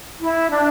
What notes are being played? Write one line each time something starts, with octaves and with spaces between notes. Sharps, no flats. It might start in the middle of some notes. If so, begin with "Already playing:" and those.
E4
D4